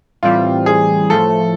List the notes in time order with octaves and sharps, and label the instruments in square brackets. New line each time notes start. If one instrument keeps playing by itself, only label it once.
[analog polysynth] A2 E3 G3 C4 [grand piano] F4
[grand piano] G#4
[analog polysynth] A2 F3 A3 [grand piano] A4